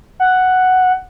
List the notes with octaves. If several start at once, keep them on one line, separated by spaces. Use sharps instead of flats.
F#5